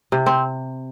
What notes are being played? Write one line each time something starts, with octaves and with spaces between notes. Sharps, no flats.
C3
C4